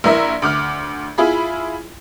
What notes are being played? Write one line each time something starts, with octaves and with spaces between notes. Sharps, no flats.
A#1 E4 A#4 E5
D2 D6 F6
E4 F4 G#4 B5